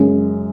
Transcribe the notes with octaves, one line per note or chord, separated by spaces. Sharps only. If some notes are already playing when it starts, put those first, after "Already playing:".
Already playing: F#2 C#3 G#3